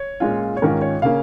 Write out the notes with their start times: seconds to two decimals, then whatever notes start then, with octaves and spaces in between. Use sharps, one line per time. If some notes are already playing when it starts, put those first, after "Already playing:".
Already playing: C#5
0.20 A#2 G#3 C#4 F4
0.57 C#5
0.62 G#2 D#3 C#4 F4 A#4
0.81 C#5
1.02 C#3 A#3 C#4 F5